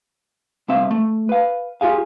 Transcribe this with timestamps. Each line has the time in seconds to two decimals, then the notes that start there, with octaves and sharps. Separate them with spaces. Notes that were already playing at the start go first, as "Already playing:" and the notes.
0.68 C2 C4 E5 F5
0.91 A3
1.29 B4 F5
1.81 F4 G4 G#4 F5